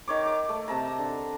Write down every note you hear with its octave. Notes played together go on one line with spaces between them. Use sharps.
D#3 C#5 D6
D6
A3
C3 A5 A#5
D3